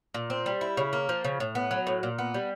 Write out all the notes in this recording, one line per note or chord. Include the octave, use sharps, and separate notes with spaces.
A#2
C4
G3
E4
C#3
A#3
F3
C#3
A2
B3
F#3
A2
A#2
B3
G3